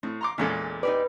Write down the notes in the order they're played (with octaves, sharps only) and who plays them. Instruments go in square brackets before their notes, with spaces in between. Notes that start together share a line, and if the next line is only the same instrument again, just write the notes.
[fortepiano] A2 [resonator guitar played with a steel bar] C4
[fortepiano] A#5 C6 D6
[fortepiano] E2 A#2 G#3 [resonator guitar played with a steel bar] E3 C#4 A4
[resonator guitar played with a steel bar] D#4 G4 D5 [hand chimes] B4